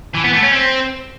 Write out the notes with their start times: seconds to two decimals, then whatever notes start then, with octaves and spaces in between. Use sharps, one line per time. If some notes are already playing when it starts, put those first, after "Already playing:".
0.15 E3
0.24 B3
0.33 A3
0.42 C#4
0.52 C4